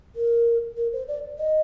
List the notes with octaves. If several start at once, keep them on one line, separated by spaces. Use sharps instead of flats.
A#4
A#4
C5
D5
D#5